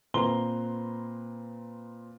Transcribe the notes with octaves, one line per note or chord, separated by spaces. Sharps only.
A#2 C4 B4 A#5 C6 G7